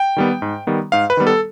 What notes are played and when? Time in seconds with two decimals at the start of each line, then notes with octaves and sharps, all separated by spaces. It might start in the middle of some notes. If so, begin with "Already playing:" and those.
Already playing: G5
0.17 D#3 G3 B3
0.42 G#2
0.67 D#3 G3 B3
0.92 G#2 F5
1.10 B4
1.17 D#3 G3 B3
1.27 A4